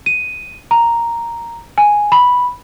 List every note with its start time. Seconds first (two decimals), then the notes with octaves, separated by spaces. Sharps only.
0.06 D#7
0.71 A#5
1.78 G#5
2.12 B5